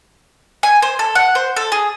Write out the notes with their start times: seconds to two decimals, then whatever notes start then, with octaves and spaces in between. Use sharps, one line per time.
0.63 G#5
0.82 C5
0.99 A4
1.15 F#5
1.35 C5
1.56 A4
1.72 G#4